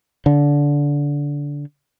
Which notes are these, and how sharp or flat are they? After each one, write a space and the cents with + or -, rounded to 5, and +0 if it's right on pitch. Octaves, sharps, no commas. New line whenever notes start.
D3 -20